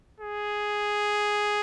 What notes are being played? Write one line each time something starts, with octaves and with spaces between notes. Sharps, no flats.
G#4